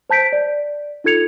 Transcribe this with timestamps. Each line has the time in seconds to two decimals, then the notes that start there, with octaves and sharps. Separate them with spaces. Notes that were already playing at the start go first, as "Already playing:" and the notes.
0.10 C5 A5 G6 B6 D7
0.33 D5
1.04 D#4 F4 A4 G#6 C#7 F7